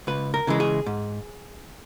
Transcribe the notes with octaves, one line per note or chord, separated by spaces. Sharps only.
C#2 B4
A#4
C#3 E3 G#3
G#4
G#2